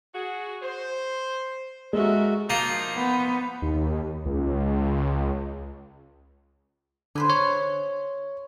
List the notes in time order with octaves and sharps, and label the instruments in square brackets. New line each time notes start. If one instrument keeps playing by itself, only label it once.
[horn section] F#4 G#4
C5
[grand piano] G#3 [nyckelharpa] F#4 E5 [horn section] A4 A#4
[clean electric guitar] F3 D#4 F4 [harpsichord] A#3
[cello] B3
[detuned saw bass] D#2
C#2
[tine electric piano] D3 [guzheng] G#4 B4 C5
[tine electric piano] C#5